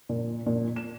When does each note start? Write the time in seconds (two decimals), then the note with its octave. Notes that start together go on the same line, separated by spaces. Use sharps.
0.09 A#2
0.46 A#2
0.76 E7